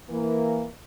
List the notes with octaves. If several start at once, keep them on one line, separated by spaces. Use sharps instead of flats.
E3 A#3